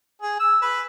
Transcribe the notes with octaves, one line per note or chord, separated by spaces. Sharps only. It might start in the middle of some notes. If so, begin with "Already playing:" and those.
G#4
E6
B4